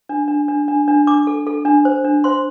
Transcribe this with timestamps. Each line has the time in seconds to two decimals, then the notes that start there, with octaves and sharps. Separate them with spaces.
0.09 D4
0.28 D4
0.48 D4
0.68 D4
0.88 D4
1.07 D4 D6
1.27 A4
1.47 A4
1.65 D4
1.85 C5
2.04 D4
2.24 C5 C6